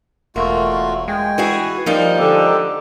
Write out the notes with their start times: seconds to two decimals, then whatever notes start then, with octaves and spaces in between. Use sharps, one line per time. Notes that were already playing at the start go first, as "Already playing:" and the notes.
0.36 E1 A3 A#3 F4 F#4
1.08 G#3 G5 G#5
1.38 E3 F#4 G#4
1.86 F3 G3 A#3 D#4 A#4
2.19 D3 G#3 G4 A4